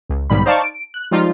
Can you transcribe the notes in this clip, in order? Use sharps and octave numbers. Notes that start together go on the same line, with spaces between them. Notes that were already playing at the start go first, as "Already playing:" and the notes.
C#2
B1 G#2 D#3 G3 B5
D#4 C5 D5 F5 A5 C#6
D7
F#6
F3 G3 G#3 D#4 F4